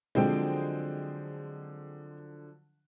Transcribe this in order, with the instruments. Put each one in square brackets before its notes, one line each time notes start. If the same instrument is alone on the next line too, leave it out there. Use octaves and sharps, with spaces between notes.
[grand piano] D3 F3 F#3 [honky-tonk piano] G#3 C4 G5